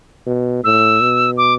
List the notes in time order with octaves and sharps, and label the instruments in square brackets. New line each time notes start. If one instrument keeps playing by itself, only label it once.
[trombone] B2
[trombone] A2 [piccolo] E6
[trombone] B2
[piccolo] D6